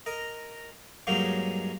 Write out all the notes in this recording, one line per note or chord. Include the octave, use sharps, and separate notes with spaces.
A#4 D#5
G2 F#3 G#3 A#3 C#4 D#4